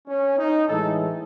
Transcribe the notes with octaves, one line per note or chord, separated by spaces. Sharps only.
C#4
D#4
A2 E3 G#3 A4